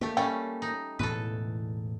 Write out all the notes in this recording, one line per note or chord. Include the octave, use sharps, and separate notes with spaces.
A3 A#3 G4
G3 A3 C#4 G5
D#4
E1 A2 E3 A4 B4